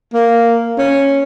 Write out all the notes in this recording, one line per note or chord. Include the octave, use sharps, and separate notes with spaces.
A#3
C#4